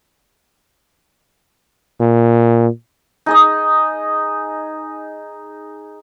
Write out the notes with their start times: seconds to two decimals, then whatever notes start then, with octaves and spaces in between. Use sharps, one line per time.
2.00 A#2
3.26 D#4 G#4 D#5